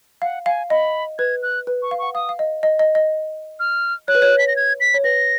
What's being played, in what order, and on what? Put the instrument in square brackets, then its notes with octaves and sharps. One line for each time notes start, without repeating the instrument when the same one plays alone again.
[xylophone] F5 [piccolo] F#5
[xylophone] F5 [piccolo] G#5
[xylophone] D#5 [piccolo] B5
[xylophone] B4 [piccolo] G#6
[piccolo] F#6
[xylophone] B4
[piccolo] C#6
[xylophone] F5
[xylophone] F#5 [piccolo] C#6
[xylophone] F5 [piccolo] D#6
[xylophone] F5
D#5
D#5
D#5
D#5
[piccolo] F6
[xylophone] C#5 [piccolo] F#6
[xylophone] B4
C#5
[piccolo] B6
A#6
G#6
B6
[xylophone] C#5
[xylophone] B4 [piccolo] A#6